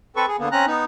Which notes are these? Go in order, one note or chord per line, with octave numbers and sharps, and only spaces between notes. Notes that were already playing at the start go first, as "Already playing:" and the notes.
C4 A4 B4 C#6
G#4
D3 A#3 B3
C4 C#4 A#5 F#6
B3 D#4